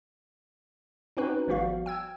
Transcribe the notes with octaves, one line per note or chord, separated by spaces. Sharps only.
C4 C#4 D#4 F#4 B4
G#1 F3 G3 B3 F#4 F5
G5 E6 G#6